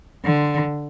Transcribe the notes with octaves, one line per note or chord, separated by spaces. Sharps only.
D3